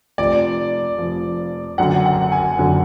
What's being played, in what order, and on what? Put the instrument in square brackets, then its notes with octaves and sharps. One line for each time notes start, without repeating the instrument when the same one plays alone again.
[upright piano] F1 F2 F3 [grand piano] D5
[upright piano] F1 F2 F3
[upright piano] F#1 F#2 D3 [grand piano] F#5
[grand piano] F#5
G#5
[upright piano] F#1 F#2 D3